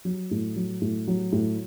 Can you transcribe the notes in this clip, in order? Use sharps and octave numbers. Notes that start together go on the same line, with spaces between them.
F#3
A2
F#3
A2
F#3
A2